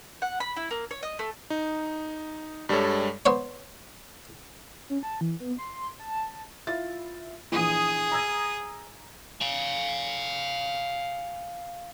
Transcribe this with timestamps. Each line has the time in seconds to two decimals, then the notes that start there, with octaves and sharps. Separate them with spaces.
0.22 F#5
0.40 B5
0.56 E4
0.71 A#3
0.91 C#5
1.03 D#5
1.19 A3
1.50 D#4
2.69 G2 G3 G#3 A4 C#5
3.26 B3 C5 C#5
4.90 C#4
5.03 A5
5.21 E3
5.40 B3
5.58 C6
5.99 A5
6.67 E4 F4 A6
7.52 A#1 E3 G#4 D#6
8.12 A#5 E6 G#6
9.42 F5 G#5